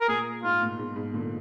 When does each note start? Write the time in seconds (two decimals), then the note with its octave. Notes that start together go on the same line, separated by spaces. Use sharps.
0.01 A#4
0.08 A#2 G#4
0.43 G#2 F4
0.62 A#2
0.78 G#2 B2
0.96 G#2 B2
1.13 A#2 D3